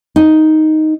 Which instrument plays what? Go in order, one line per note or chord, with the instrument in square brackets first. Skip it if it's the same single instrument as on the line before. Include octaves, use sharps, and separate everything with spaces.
[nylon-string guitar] D#4